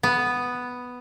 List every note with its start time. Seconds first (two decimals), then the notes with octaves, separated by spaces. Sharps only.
0.03 B3